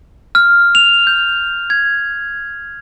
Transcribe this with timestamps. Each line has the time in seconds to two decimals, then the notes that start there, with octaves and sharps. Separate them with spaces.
0.35 F6
0.75 F7
1.07 G6
1.70 G#6